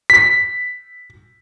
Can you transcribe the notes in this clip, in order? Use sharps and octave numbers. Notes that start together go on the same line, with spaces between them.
B6